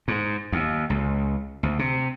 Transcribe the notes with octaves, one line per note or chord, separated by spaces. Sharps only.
G#2
D#2
C#2
D2
C3